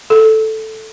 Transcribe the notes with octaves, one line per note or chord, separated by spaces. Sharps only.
A4